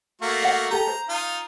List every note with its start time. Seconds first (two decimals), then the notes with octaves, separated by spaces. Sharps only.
0.22 A3 A#3 F#4
0.42 F5 F#5
0.71 G4 A4 A#5
0.87 C5
1.09 D#4 F4